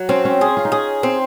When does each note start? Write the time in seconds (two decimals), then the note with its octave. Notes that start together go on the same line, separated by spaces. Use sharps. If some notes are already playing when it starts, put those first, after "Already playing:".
Already playing: F#3
0.09 C4 C#4
0.25 C#4
0.41 C#4 G#4
0.57 F4
0.65 D#4
0.72 C#4 G#4
1.03 C4